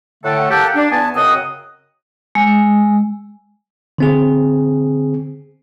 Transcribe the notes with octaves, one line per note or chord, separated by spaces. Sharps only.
A2 D3 A3 A4 F#5 G5
A#3 G4 A4 F#5 G5 A5
D4
E2 B3 G#5 A5
F#2 C#3 C4 D#5 F#5 D#6
G#3
D3 C4 G#4